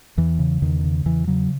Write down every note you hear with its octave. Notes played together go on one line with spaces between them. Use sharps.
E2 E3
C#3
E2 D#3
C#3
E2 E3
C#3 F#3